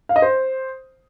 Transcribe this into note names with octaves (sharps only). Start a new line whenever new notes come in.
F5
D#5
C5